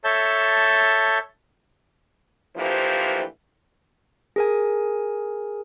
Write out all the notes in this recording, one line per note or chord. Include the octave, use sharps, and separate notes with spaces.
A4 C#5 E5 A5 G6
D2 E3 F3 A#3 G4 C5
G#4 A#4 G#5